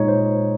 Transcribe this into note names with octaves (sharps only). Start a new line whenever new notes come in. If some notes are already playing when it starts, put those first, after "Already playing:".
Already playing: A#2 G#3 D#4 C#5
C5